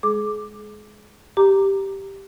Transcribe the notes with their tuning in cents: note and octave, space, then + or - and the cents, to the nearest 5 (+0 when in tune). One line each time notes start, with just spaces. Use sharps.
G#3 +0 G#4 +35 D6 +0
G4 +0 A#5 +0 D6 -5